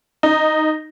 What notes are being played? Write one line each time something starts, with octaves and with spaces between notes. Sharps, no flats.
D#4